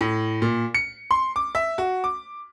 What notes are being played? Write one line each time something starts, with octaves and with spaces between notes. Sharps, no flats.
A2
A#2
C#7
C6
D6
E5
F#4
D6